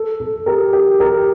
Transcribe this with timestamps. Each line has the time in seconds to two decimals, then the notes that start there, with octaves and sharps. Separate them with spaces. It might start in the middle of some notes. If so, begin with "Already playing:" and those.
Already playing: A4
0.20 A4
0.46 G4 A#4
0.73 G4 A#4
1.00 G4 A#4